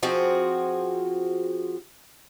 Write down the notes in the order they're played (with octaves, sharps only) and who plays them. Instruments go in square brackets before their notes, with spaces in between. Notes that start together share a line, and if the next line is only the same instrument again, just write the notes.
[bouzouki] F3 C4 F#4 G#4